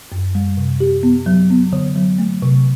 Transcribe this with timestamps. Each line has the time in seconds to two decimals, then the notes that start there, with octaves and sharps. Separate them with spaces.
0.12 F#2
0.35 G3
0.57 C3
0.80 G4
1.03 B3
1.26 F#3
1.50 B3
1.73 D3
1.96 F#3
2.18 A3
2.42 C3